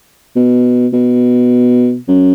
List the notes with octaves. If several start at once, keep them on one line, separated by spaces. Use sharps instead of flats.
B2
B2
F#2